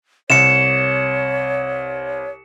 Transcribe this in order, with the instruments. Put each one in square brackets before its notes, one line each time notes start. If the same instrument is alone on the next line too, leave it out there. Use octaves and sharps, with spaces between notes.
[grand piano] C2 [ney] C#5 [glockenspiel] C#7 E7